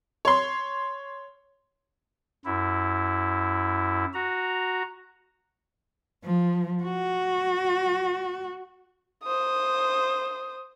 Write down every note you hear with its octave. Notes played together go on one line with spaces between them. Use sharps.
C#5 C6
F#2 E4
F#4 A#5
F3
F#4
C5 D#6